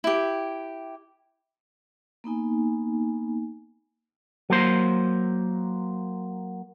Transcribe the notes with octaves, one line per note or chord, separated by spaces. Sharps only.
E4 G4
A#3 B3 D#4 G#5
F#3 A#3 C5